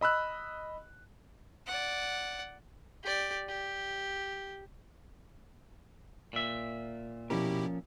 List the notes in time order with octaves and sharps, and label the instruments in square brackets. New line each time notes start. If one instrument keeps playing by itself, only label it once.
[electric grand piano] D#5 B5 E6 F#6
[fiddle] D5 F#5
[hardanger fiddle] G4 D5
G4
[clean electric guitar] A#2 E5
[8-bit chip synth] B2 E4 G4 [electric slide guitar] F3 C#4 A#4